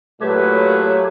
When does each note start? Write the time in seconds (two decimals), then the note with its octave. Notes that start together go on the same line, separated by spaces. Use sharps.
0.21 A#2 F#3 A3 G4 B4 C#5